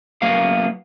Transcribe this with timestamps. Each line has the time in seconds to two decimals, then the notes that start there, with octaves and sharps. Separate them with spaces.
0.22 F#3 A#3 B3 F5